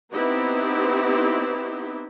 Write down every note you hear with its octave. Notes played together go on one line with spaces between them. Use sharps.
B3 C4 D#4 E4 G4